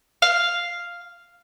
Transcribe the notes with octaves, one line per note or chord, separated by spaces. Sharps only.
F5